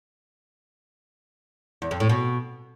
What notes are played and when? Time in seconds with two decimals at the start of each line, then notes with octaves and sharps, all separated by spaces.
1.82 E2
1.91 F2
2.00 A2
2.09 B2